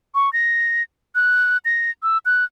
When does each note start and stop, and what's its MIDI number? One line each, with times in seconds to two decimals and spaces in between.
0.15 0.32 85
0.33 0.83 94
1.15 1.58 90
1.65 1.90 94
2.03 2.18 88
2.26 2.45 90